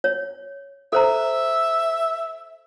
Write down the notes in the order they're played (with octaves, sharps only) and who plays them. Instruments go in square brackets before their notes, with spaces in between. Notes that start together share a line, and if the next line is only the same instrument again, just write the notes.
[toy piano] C#5
[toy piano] A4 C5 A#5 [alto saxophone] E5